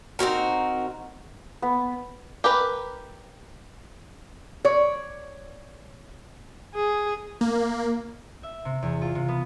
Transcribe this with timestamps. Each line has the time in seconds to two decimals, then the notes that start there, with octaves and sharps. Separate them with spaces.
0.19 C4 D#4 F#4 A#4
1.62 B3
2.44 G4 A#4 B4
4.65 C#5 D5
6.75 G#4
7.41 A#3
8.43 E5
8.65 C3
8.82 E2
9.02 F4
9.15 C3
9.28 B3